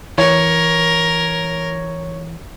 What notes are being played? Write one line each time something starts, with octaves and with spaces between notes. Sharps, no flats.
E3 A#4 C#5